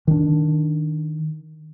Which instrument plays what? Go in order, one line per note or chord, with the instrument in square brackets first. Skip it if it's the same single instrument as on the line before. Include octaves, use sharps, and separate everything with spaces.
[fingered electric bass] D#3 D4